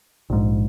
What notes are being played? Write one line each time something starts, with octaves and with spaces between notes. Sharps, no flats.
A#1 G#2